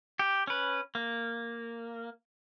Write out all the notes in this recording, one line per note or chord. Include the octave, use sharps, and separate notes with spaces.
G4
C#4 B4
A#3